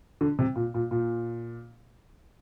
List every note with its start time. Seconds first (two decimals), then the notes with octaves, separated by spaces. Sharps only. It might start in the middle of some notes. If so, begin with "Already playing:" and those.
0.21 D3
0.39 C3
0.56 A#2
0.74 A#2
0.91 A#2